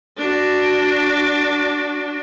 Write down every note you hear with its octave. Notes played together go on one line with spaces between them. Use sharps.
D4 F#4